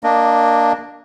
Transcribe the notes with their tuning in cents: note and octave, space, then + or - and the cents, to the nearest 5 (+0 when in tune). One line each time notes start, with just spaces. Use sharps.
A#3 +0 D4 +0 D#5 -20